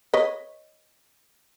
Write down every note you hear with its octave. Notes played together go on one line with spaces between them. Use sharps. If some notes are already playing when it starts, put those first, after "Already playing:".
B4 C#5 D#5